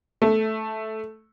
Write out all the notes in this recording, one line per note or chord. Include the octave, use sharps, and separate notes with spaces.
A3